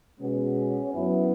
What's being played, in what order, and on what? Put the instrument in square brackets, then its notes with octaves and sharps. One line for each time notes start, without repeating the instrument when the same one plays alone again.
[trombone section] B2 G#3 B3 C#4
F#2 F#3 B3 E4